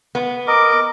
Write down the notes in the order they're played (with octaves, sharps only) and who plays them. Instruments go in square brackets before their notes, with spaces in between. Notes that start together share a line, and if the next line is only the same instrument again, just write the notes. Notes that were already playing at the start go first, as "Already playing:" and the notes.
[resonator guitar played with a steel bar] B3
[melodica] A#4 D#5 [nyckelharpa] D6